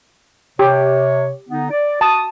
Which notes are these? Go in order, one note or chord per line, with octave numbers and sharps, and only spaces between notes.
C3 G4 C#5
D3 B3 D#4
D5
F#4 A5 D#6